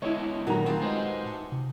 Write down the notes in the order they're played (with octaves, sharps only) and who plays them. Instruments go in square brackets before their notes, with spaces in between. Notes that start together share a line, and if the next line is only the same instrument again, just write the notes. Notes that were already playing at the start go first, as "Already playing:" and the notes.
[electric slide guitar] D3 G#3 B3 [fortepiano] E4 C#5 [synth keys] D#5
[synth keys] A#2 [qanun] D#3 G3 A3 [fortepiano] F#3 A#5
[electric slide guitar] C4 [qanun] F4 G4 G#4
[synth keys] G#3 B4 D#5 [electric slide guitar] D#4 C5
[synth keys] A2 A5 C#7
C3